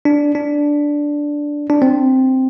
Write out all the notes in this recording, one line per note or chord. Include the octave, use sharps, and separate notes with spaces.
D4
D4
D4
C4